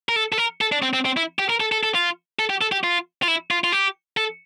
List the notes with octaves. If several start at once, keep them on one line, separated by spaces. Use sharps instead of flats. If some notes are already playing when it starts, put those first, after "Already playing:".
A#4
A4
A4
A#4
A4
D4
C4
C4
C4
E4
G4
A#4
A4
A4
A4
F4
A4
G4
A4
G4
F4
F4
E4
F4
F4
G4
A4